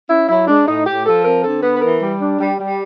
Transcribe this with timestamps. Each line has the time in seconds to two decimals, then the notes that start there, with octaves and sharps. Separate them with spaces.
0.09 C#4 E4
0.29 F#3 E4
0.47 G#3 D4
0.67 A2 D#4
0.86 A2 G4
1.05 F3 A4
1.25 C4 A#4
1.44 D3 A4
1.63 B3 B4
1.76 B4
1.81 E3 A#4
2.01 G3
2.20 D4
2.39 G3
2.59 G3